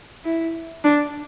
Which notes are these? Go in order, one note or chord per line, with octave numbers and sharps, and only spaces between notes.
E4
D4